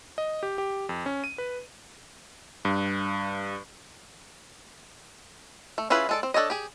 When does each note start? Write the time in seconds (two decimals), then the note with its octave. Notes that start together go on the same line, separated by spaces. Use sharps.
0.18 D#5
0.43 G4
0.58 G4
0.89 F2
1.06 C#4
1.24 D#7
1.38 B4
2.65 G2
5.78 A3
5.90 C#4 E4 F4 G#4 B4
6.09 G#3 A4 D5
6.23 C4
6.34 D4 A4 C#5 D#5
6.50 G4 G#4